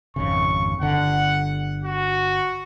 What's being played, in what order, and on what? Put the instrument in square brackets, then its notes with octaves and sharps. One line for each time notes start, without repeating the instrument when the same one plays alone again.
[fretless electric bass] G#1 F2 C#3 [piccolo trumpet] C#6
[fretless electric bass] G1 D3 [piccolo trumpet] F#5
[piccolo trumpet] F#4